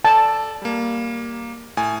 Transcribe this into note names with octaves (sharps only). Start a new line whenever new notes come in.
A4 D5 A5
G3 A#3
A2 G#5